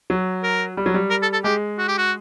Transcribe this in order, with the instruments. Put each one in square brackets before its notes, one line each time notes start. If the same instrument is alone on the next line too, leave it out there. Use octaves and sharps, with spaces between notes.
[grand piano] F#3
[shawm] A#4
[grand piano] G3
F#3
G3
[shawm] A#4
A4
A4
[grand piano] G#3 [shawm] G4
[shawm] F#4
G4
F#4